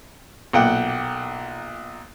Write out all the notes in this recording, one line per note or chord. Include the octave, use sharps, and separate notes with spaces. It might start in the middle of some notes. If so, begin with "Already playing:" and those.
B1 A#2 F#5 G5